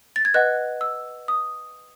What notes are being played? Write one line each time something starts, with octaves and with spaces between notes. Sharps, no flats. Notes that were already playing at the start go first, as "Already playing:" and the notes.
A6
G#6
B4 D#5 F#5 F#6
E6
D#6